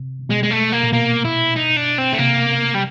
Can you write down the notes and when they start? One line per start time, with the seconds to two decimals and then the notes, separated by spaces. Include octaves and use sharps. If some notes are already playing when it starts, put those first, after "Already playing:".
Already playing: C3
0.29 B2 G#3
0.43 G#3
0.50 A3
0.72 A#3
0.83 A#2
0.93 B2 A#3
1.25 E4
1.56 D#4
1.76 D4
1.98 C4
2.14 A3
2.18 C3 A#3
2.75 G3